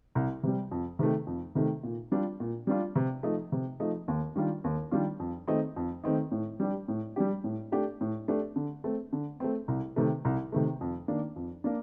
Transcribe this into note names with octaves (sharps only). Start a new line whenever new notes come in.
C2
C3 G3
F2
C3 D#3 A3
F2
C3 D#3 A3
A#2
G3 D4 F4
A#2
G3 D4 F4
C3
F3 A3 D#4
C3
F3 A3 D#4
D#2
D#3 G3 D4 F4
D#2
D#3 G3 D4 F4
F2
D#3 A3 C4 D#4
F2
D#3 A3 C4 D#4
A2
G3 D4 G4
A2
G3 D4 G4
A2
A3 D4 G4
A2
A3 D4 G4
D3
A3 C4
D3
A3 C4
C2
C3 D#3 A3
C2
C3 D#3 A3
F2
D#3 A#3 D4
F2
A#3 D4